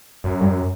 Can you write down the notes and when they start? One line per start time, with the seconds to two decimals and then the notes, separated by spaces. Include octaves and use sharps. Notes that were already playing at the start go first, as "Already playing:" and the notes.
0.24 F#2
0.41 G2
0.46 F#2